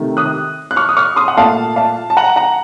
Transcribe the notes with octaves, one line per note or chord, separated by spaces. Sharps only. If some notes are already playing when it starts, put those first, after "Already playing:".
Already playing: C3 D#3 A3
D#6 F#6
F#6
C#6 F6
D#6
C#6 F6
C6 D#6
F#5
A#2 A3 F5 A5
F5 A5
A5
F#5 A#5
F#5 A#5